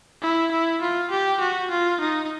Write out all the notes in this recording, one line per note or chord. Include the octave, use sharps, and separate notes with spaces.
E4
E4
F4
G4
F#4
F4
D#4